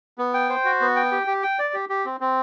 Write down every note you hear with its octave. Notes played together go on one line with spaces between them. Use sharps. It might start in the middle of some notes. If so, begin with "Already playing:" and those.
B3
G5
C5
F#4
B3
G5
G4
G4
G5
D5
G4
G4
C4
C4